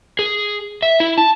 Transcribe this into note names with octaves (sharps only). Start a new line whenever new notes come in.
G#4
E5
E4
A5